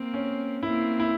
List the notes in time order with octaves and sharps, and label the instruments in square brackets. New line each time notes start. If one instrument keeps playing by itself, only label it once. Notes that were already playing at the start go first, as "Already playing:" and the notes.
Already playing: [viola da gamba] A#3 C4
[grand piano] C#4
[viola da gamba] A#3 C4 [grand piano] E4
[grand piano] E4